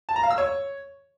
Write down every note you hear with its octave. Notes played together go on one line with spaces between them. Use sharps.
A5
A#5
F5
E6
C#5